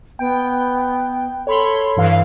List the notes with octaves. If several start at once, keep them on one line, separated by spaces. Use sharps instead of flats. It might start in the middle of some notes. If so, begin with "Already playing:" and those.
B3 G5
A4 C#5 B5 C6
G2 E3 F5